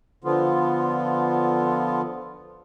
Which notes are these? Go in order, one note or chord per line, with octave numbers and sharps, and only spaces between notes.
D3 F3 B3 F4